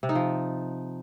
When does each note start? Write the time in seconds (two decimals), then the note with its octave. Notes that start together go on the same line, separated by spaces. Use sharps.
0.03 C3
0.09 D#4
0.15 F3